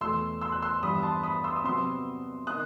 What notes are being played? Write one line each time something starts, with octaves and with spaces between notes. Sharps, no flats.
E2 B2 A3 C6 E6
C6 E6
F#6
C6 E6
G2 E3 G3 B3 B5 D#6
A5 C6
B5 D#6
C6 E6
D#6
C3 F#3 B3 C6 E6
D#3 D#6 F#6